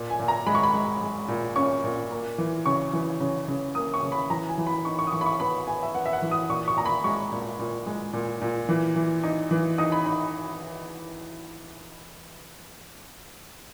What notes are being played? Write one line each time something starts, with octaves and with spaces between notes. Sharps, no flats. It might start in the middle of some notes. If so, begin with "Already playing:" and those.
Already playing: A#2
G#5
A#2
A#5
G#3 B5
C#6
B5
G#3
G#3
A#2
C#4 C#6
A#2
A#3
E3
C#3 C#6
E3
C#3
C#3
A#3 D#6
C#6
C#3
B5
E3 A#5
G#5
E3
B5
D#4 C#6
C#6
D#6
E3 C#6
B5
C#6
B3 B5
B3 G#5
E5
B3 F#5
E5
F#5
E3
D#6
A#2 C#6
C#6
A#2 A#5
B5
G#3 C#6
A#2
A#2
G#3
A#2
A#2
E3
E3
D#4
E3
D#4 D#6
B5
D#4 B5